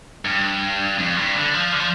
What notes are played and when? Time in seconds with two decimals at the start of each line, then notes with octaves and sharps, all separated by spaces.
0.25 G2
0.98 F2
1.17 G2
1.35 D3
1.54 F3
1.72 D3
1.79 F3